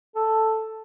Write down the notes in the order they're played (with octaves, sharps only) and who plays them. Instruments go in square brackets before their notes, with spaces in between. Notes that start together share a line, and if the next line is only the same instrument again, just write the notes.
[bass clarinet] A4